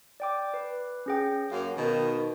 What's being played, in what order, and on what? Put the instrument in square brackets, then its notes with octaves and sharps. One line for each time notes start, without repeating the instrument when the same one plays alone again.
[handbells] D5 G5 D6
B4
C#4 G#4 G5
[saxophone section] F#2 F#3 A#3 [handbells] F5
[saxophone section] B2 D#3